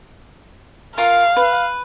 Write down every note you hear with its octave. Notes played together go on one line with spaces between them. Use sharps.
F4 A#4 F5
B4